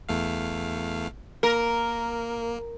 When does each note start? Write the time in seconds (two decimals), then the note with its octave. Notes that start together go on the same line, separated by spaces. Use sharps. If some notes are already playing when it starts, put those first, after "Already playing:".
0.09 E2 A3 F5
1.43 A#3 A#4